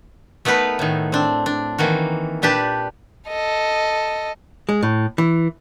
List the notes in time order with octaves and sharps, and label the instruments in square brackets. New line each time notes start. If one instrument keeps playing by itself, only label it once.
[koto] A3 B3 D#4 A#4 B4
A2 D#3
C4 D4
D4
D#3 E3 A#3 F#4
A#2 D4 G4 B4 A5
[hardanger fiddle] A4 D#5
[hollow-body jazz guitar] G#3
A2
E3